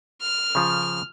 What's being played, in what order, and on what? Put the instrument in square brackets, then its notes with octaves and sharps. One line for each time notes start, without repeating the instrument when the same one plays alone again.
[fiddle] F6
[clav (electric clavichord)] C#3 F3